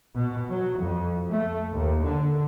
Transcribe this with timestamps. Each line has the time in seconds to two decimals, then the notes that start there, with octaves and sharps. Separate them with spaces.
0.15 B2
0.49 F#3
0.79 F2
1.30 A3
1.72 D#2
2.04 D3